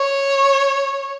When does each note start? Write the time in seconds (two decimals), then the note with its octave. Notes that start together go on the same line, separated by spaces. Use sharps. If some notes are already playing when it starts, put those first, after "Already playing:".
Already playing: C#5